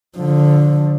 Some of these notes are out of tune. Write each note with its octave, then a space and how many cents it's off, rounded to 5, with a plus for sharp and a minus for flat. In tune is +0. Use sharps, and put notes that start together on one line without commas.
D3 +0 F3 +20